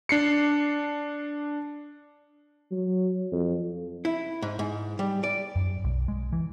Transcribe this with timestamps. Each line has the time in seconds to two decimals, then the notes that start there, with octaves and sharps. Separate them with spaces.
0.09 D4 C7 C#7
2.71 F#3
3.32 F2
4.05 E4
4.42 G#2
4.59 G#2
4.99 G3
5.24 D5
5.56 F#2
5.84 B1
6.08 G#3
6.33 E3